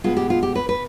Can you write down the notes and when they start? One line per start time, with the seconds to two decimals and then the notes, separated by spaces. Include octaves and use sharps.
0.04 B2 G#3 B3 F4
0.17 G4
0.30 F4
0.43 G4
0.55 B4
0.69 B4